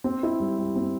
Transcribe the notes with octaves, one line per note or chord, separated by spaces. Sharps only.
C4
E4
G3
G3
C4